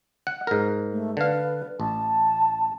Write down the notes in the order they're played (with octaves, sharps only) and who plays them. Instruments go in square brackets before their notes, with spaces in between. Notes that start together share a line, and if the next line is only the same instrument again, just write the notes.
[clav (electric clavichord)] F#5
G#2 A#4
[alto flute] A3
[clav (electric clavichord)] D3 F5 [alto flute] B4
[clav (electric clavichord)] A1 [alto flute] A5